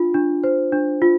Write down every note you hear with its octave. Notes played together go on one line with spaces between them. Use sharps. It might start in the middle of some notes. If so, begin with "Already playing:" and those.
Already playing: D4 F4
D4
C5
D4
F4